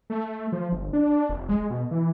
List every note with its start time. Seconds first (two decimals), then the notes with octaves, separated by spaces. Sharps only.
0.10 A3
0.52 F3
0.72 G1
0.93 D4
1.29 F1
1.49 G#3
1.70 B2
1.91 E3